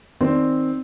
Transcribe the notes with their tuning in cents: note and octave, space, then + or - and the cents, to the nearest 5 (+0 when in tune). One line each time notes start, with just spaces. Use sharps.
D#3 +0 C4 +0 D5 +0